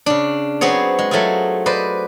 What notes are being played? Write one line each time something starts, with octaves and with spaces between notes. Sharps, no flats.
C#3 D4
F#3 B3 C4 G#4 C#5
G#3
F#3 A3 C4 F4 G#4
B4 C5 D5 D#5